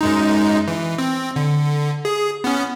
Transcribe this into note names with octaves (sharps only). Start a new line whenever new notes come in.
F#2 G#3 D#4
E3
C4
D3
G#4
B3 C#4